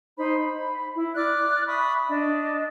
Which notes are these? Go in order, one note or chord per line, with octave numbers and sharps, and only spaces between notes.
D#4 C5 B5
B5
E4
D5 D6 F6 F#6
E5 B5 C#6 D#6
D4 D#5